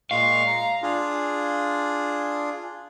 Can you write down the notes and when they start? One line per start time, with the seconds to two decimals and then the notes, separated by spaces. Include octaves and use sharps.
0.11 A#2 G#3 F5 C#6
0.47 A#5
0.83 D4 F4 G#4